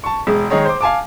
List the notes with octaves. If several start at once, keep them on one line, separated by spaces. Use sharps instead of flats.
A5 C#6
E1 G#3
D#3 G#3 G#4 C#5 D#5
C5 D6
F5 G#5 A5 D6